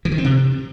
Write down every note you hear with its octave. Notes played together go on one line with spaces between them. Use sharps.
E3
D#3
C4
C3